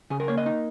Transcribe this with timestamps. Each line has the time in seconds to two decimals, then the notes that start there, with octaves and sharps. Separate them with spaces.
0.10 C#3 G#4
0.20 A#4
0.28 A#3 C#5
0.38 D#5
0.46 D#4